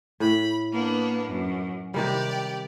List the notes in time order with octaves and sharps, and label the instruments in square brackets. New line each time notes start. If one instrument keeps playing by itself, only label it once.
[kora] A2 [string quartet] B5
[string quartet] A#3 B3 D4
F#2
[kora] C3 D#3 G3 [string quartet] G4 D5